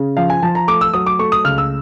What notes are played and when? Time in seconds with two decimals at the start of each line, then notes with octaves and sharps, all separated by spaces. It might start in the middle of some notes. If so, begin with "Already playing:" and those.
Already playing: C#3
0.17 F3 F5
0.30 G#5
0.43 F3 A5
0.55 A#5
0.68 A3 D6
0.81 E6
0.94 F#3 D#6
1.06 D6
1.19 A3 C#6
1.32 D#6
1.44 C#2 F6
1.58 E6